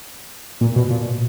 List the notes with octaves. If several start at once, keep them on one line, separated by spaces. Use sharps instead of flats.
A#2
B2
A#2